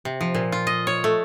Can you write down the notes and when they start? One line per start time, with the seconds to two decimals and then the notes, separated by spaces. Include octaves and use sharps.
0.05 C3
0.21 F3
0.35 A#2
0.52 F4
0.67 D#5
0.87 C#5
1.04 A3